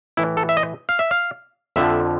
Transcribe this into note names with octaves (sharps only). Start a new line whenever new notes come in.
A2 E3 E4
A4
E5
D#5
F5
E5
F5
F2 D3 F3 E5